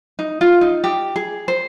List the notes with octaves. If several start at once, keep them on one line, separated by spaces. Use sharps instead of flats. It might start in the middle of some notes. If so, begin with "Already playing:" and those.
D#4
F4
D#4
G4
G#4
C5